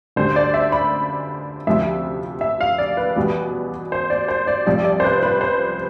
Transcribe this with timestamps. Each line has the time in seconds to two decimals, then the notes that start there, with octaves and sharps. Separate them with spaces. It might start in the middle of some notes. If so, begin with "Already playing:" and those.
0.16 D2 D3 G3 C5
0.36 D5
0.54 E5
0.72 B5
1.67 D2 C3 F3 E5
2.41 E5
2.61 F5
2.78 D5
2.97 B4
3.16 E2 B2 G3
3.92 C5
4.10 D5
4.28 C5
4.47 D5
4.66 C2 C3 F3 D5
4.85 D5
5.00 C5
5.04 B4
5.23 B4
5.41 C5